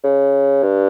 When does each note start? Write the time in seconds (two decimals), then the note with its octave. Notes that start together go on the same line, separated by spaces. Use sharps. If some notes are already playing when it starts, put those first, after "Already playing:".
0.04 C#3
0.63 G2